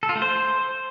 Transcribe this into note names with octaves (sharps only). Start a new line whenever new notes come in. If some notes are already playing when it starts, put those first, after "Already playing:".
A4
F4
A3
C5